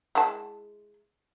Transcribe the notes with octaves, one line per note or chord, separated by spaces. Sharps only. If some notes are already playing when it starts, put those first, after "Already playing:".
G#3 E4 A5